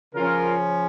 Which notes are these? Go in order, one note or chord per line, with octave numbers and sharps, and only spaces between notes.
C#3 F3 C#4 F4 A#4